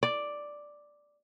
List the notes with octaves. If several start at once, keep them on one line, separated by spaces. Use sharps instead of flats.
D5